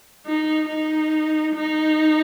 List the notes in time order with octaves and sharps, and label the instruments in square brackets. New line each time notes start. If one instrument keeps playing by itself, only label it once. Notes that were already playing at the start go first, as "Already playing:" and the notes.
[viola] D#4
D#4
D#4